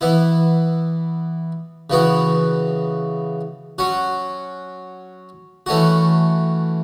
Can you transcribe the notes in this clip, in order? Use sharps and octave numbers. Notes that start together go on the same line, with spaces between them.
E3 B3 E4
C#3 E3 B3 F#4
F#3 C#4 F#4
E3 A3 C#4 F#4